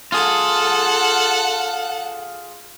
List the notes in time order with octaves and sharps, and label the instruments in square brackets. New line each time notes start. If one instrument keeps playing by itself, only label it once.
[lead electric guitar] F4 G#4 [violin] A4 F#5